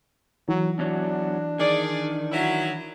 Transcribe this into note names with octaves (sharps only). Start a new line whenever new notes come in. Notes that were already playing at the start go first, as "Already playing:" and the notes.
E3 F#3
E2 F#3 D4
D#3 G#4 D5
F#3 E4